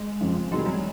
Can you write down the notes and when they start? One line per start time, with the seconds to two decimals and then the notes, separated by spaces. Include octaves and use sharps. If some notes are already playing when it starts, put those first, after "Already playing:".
Already playing: G#3
0.21 F2 C#3 F3
0.51 E2 C3 D#3 F#3 G#3
0.59 G3
0.66 F#3
0.73 G3